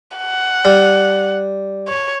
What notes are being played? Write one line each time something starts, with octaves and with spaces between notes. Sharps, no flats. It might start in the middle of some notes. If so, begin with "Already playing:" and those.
F#5
G3
C#5